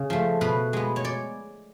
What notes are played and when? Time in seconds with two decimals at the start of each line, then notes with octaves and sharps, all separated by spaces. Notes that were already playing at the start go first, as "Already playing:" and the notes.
Already playing: C#3
0.10 F3 A3
0.41 B2 B4
0.73 G#3 B3
0.96 C#5
1.05 D5